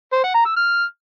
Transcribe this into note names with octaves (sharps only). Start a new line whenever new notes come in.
C5
F#5
A#5
E6
F6